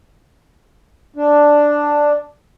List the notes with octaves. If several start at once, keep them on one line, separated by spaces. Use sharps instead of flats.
D4